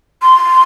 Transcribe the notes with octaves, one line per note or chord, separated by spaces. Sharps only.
C6